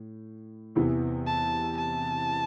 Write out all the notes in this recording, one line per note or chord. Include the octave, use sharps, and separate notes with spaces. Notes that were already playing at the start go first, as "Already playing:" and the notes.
Already playing: A2
E2 C3 E3 B3
A5
A5